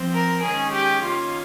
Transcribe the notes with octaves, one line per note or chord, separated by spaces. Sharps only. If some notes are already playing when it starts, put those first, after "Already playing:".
Already playing: F3 C4
A#4
D#3 G#3 C#4 G#4
G4
D#3 A#3 C#4 F4